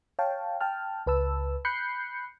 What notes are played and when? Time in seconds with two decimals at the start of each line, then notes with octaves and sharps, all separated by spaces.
0.19 C#5 F5 G5 A5
0.61 G5 A5 F6
1.07 C#2 B4 A5 E6
1.65 B5 F#6 G6 C7 C#7